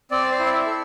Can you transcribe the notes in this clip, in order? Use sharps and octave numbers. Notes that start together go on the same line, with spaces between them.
C4 D5
C5
E4
D5
E5
A4